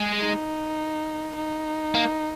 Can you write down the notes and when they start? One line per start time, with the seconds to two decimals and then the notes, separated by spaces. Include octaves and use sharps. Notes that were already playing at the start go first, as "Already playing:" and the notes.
Already playing: G#3
0.21 D#4
1.36 D#4
1.95 A#3